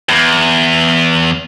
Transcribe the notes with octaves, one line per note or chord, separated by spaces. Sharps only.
E2